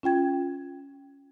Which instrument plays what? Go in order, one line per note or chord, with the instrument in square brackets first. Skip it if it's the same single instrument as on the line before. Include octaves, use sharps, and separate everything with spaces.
[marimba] C#4 F4 G5 G#6